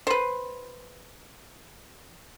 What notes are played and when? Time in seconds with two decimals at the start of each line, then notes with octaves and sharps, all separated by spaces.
0.07 B4 C5